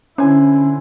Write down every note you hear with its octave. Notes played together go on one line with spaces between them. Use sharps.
D3 C#4 E4 C5 G#5